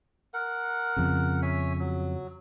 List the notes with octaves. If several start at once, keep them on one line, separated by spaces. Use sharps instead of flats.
A#4 F#5
F2 C#3
C#5 E5 G#5
F#3